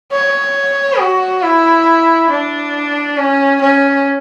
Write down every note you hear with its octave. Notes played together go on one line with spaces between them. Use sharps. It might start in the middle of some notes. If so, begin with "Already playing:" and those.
C#5
F#4
E4
D4
C#4
C#4